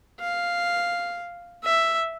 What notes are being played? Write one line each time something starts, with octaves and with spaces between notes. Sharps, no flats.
F5
E5